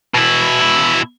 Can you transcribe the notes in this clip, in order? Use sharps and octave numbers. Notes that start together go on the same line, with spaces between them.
B2 E4